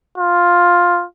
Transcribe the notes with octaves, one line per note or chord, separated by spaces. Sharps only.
F4